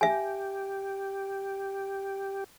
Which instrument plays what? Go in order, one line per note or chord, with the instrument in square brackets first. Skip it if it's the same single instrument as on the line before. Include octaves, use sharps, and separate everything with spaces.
[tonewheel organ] G4 [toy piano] E5 G#5